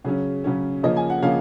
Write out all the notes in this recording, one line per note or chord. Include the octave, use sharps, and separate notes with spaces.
C#3 F#3 C#4 G#4
C#3 F#3 C#4
C#3 F3 A#3 C#4 D#5
G#5
F#5
C#3 F3 A#3 C#4 F5